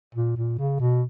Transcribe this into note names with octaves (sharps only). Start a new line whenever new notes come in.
A#2
A#2
C#3
B2